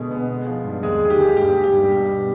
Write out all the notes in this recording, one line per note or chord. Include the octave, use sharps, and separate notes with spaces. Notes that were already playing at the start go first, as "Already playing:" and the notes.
Already playing: B2 D3 G#3 B3 G#4
B3
G#3
F3
G2
D#2 G#3 G#4
D#3 G#4
G4
D#2
G2 G4
G2
G4
G2
B2
B3